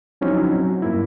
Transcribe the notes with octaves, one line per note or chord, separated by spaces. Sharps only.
F3 F#3 C4 C#4 D#4 E4
F#3
G2 A#3 E4